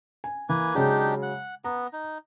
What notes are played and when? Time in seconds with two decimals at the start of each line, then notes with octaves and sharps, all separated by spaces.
0.24 G#5
0.49 E3 A#3 B4 G#5
0.75 C#3 F#3 G#3 D4 D#4 G4
1.22 F#5
1.64 B3 A#5
1.93 D#4